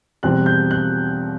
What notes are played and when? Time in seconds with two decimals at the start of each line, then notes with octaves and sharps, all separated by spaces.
0.23 E2 B2 G3 C4 F#6
0.46 G6
0.71 F#6